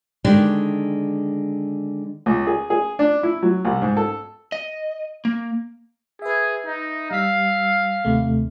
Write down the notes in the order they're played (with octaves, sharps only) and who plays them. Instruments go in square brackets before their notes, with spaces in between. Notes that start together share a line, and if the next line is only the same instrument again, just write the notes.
[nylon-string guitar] D3 D#3 G#3 D4 G4 D5
[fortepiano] C#2
G#4
G#4
D4
E4
F#3
C2
G#2
A4
[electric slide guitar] D#5
A#3
[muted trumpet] G#4 [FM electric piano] B4 E5
[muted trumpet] D#4
[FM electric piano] G3 E6 B6 [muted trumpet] F5
[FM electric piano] D#2 C3 A3